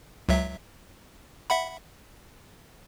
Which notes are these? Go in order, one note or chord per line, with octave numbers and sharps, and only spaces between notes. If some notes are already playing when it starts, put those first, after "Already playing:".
C#2 F#3 E5
E5 F#5 B5